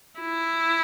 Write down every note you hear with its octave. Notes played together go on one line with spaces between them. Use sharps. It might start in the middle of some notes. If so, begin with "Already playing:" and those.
E4